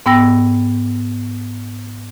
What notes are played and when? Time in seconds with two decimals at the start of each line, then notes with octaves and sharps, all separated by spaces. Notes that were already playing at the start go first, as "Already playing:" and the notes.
0.06 G#2 B3 G5 E6 A#6